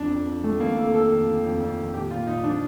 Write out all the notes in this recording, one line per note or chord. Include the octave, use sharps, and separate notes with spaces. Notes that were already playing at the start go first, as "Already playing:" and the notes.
Already playing: F2 D4
F2
F2
D#3 A3
F2 A#3
F2 A4
D#3 A4
F2
D#3
F2
F2
D#3
A#2 G4
A#2 F4
A#2 D#4
F3 D4